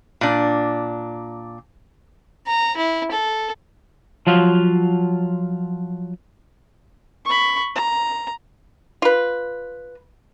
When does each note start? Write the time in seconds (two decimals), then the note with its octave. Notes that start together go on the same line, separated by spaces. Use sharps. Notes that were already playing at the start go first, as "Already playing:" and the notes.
0.21 A#2 D4
2.47 A#5
2.77 E4
3.11 A4
4.27 F3 F#3 F4
7.25 B5 C#6
7.75 A#5
9.02 F4 B4